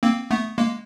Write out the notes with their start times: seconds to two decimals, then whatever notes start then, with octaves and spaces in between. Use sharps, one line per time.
0.03 A#3 C4
0.31 A3 B3
0.58 G#3 A#3